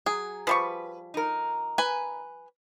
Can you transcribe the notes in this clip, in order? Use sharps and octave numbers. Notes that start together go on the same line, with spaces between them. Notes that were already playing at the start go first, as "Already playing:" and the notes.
F#3 G#4
F3 G3 B4 C#6
D#4 A#4
B4 G#5